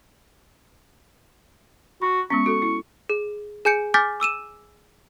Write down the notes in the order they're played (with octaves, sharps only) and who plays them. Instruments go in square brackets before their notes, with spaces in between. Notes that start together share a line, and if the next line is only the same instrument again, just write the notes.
[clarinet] F#4 [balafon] B5
[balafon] G#3 B3 C#4 [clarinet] C#6
[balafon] F#4 A4
E4
[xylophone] G#4
G#4 G#5 G6 C#7 D7
G#5 D6 F6 G6 A6 B6
D6 E6 D#7 E7